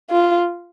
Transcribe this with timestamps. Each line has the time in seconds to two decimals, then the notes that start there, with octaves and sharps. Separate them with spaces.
0.11 F4